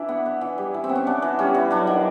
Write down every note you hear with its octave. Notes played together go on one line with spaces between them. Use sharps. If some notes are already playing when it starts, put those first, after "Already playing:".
Already playing: E3 D4 E4
B3
B3
E3
G3
E3
C4
B3
C#4
B3 D4
E3
G3 C#4
E3
F#3 D4
D#3